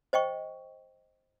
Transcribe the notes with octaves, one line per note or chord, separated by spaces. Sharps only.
C5 D#5 G5 C#6